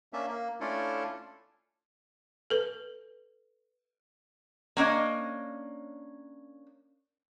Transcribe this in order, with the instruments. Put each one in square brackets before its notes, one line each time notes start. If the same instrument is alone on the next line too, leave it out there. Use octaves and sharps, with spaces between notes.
[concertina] A#3 C#4 D4 E5
A#3
A3 C#4 D4 E4 F4 A4
[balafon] A4 B4
[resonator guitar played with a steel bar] A#3 C#4 D4 D#5